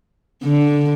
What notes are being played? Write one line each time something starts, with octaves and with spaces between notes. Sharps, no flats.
D3